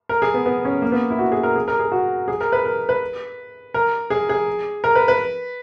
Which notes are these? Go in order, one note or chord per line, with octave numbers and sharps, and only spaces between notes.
A#4
G#4
B3
B3
C#4
A#3
B3
E4
F#4
G#4
A#4
G#4
A#4
G#4
F#4
G#4
A#4
B4
A#4
B4
A#4
G#4
G#4
A#4
B4
B4